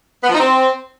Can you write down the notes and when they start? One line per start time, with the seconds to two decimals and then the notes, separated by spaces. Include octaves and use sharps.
0.23 B3
0.29 F3
0.34 D#4
0.40 C4